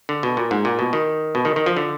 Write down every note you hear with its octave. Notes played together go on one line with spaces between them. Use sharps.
D3
B2
A#2
G#2
A#2
B2
D#3
B2
D#3
D#3
F3
D3